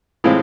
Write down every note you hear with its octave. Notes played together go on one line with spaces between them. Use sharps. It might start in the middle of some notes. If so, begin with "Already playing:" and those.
A2 E3 G#3 C4 F4